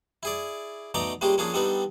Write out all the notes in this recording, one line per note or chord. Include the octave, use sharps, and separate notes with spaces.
E4 G#4 D5
B2 A3 D#4 D5 A#5 D6
G3 G#3 A#3 C#4 F4 G4
F3 A#3 C#4 D4 F4 G#4
G3 B3 C4 D4 D#4 A4